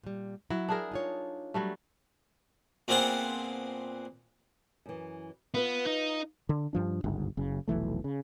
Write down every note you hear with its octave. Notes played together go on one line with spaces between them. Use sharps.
A#2 G3
F#3 E4
D4 G#4 A#4
D#4 F4 C#5
F#3 G3 A3
A#2 B3 C4 G#4 F#5 A5
F#2 E3
B3 F4 B4 F5
D#4
D3
G2 F3 D4
G1 C#2 G#2
F#1 C#3
F1 B1 E3 A3
C#3